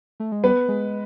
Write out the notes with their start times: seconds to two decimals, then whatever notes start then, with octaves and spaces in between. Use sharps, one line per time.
0.20 A3
0.32 G#3
0.43 G3 B3 B4
0.68 G#3